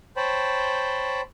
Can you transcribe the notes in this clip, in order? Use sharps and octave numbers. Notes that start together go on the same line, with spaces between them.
C5 C#5 G5 A5 B5